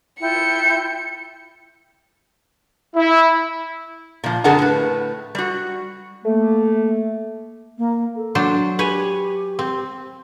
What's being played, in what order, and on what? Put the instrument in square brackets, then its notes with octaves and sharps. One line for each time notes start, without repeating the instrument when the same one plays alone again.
[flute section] E4 F4 G5 [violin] C#7
[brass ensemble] E4
[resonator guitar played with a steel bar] A#2 F3
F2 D3 G#4 A#4 F#5 A5
A2 B4
G3 F#4
[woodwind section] A3 A#3
[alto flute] A#3
A4
[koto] F#3 D4 C5
[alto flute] G4 [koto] B4 C#5 G#5
[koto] C4